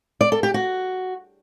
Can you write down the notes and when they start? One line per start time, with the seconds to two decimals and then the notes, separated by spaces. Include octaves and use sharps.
0.21 D5
0.32 A4
0.43 G4
0.54 F#4